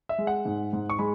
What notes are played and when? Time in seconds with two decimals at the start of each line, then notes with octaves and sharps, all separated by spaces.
0.09 E5
0.18 G#3
0.27 F#5
0.45 G#2
0.73 G#2
0.90 C#6
0.99 G#3 B5